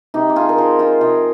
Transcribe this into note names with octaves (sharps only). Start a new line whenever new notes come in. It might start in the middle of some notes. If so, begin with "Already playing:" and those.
C3 D#4 G4
G4
F3 F4 G#4
A#4
F3 G#4 C5
F3 F4 G#4
C3 F4 G#4